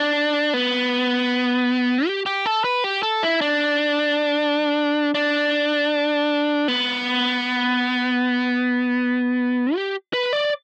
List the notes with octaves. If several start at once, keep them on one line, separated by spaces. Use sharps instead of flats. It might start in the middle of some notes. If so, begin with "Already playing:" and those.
Already playing: D4
B3
G4
G4
A4
B4
G4
A4
E4
D4
D4
B3
G4
B4
D5